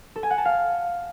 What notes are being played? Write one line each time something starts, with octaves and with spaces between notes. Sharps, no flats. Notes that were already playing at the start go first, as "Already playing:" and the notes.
A4
G#5
F#5
A5
F5